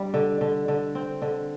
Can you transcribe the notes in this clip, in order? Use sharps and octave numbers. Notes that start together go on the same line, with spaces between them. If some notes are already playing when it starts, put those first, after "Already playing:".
Already playing: G3 D4
D3
D3
D3
C4
D3